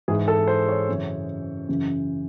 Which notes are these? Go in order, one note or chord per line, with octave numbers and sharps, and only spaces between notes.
G#2 E3 G#4
A4
C5
C#5
F#2 C#3 E3
F#2 C#3 E3